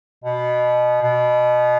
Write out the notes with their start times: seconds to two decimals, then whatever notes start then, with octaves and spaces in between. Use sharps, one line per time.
0.24 B2
1.02 B2